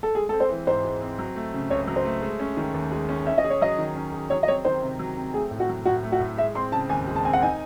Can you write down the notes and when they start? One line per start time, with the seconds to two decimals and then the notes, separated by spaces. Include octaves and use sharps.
0.03 A4
0.15 G#3 G#4
0.29 C4 A4
0.40 C5
0.49 E3
0.67 G#2 C5
0.84 G#3
1.01 C4
1.18 F#3
1.36 A3
1.54 C#3
1.70 C#2 C#5
1.87 F#3
1.96 C5
2.05 A3
2.22 G#3
2.40 C#4
2.57 D#3
2.74 D#2
2.92 G#3
3.09 C#4
3.27 C#4 E5
3.38 D#5
3.44 G#4
3.50 C#5
3.61 F#3 D#5
3.78 D#3
3.96 C#4
4.12 G#4
4.30 F#3 C#5
4.43 D#5
4.48 C4 C#5
4.65 D#3 C5
4.82 C3
4.99 F#3
5.17 C4
5.34 A3 G#4
5.51 A2
5.60 F#4
5.69 F#3
5.86 A2 F#4
6.03 A3
6.12 F#4
6.20 A2
6.37 G#3 E5
6.55 C4 C6
6.72 C#3 A5
6.89 D#2 G#5
7.07 G#3
7.16 A5
7.25 C4 G#5
7.33 F#5
7.42 D#4 G#5